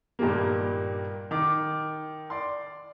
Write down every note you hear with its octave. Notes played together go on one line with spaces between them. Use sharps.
G2 A#2 D#3 G3 A#3
D#3 D6
D5 C6